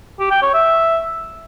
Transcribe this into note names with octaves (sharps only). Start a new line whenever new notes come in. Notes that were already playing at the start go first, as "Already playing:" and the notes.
G4
G5
C#5
E5